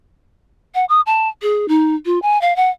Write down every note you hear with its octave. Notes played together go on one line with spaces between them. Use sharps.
F#5
D#6
A5
G#4
D#4
F4
G#5
F5
F#5